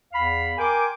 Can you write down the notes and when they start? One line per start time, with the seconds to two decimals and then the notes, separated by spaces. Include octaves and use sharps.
0.13 E2 F5 B5
0.58 A#4 G5 G#5 C6 D6